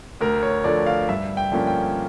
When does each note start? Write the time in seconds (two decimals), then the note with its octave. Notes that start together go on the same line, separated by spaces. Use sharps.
0.21 D2 A#4
0.43 C#5
0.64 D3 F3 A3 D5
0.86 F5
1.09 G2 E5
1.37 G5
1.52 D3 F3 A#3 C#4
1.67 G5